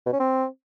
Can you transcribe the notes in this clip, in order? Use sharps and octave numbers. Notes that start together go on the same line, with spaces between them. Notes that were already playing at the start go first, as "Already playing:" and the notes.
B2
C#4
C4